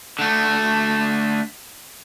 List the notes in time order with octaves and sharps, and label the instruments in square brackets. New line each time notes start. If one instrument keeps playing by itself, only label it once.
[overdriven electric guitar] D3 A3